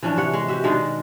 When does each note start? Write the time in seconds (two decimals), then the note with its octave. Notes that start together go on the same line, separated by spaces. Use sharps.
0.03 E3 F3 C#4 D4
0.17 C3 C#5 F#5
0.33 G#3
0.48 F#4 G4 E5
0.64 B2 D#3 G#3 D4